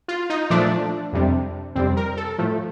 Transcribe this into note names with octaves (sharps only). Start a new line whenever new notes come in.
F4
D#4
A#2 F3 A3 D4
F2 C3 G3
F2 C3 G3 C4
A#4
A4
A2 F3 A3